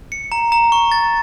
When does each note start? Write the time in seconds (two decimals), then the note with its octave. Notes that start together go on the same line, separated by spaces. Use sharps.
0.12 C#7
0.32 A#5
0.52 A#5
0.72 C#6
0.92 A6